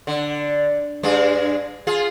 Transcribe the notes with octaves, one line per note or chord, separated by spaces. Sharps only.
D3
G2 G#3 D4
F4 G#4